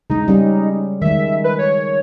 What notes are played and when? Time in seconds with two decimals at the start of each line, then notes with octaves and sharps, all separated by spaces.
0.10 C#3 G#3 D#4
0.28 G3 C#4
1.02 D#3 G#3 E5
1.44 B4
1.59 C#5